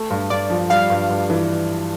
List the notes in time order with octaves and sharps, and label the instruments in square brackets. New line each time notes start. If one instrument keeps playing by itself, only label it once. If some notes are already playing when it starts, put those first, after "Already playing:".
Already playing: [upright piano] A3
G2
[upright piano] G2 [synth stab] D5
[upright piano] F3
[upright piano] G3 [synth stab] F5
[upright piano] G2
G2
E3